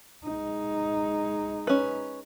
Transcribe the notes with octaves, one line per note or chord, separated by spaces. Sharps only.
G#3 D#4
C#4 B4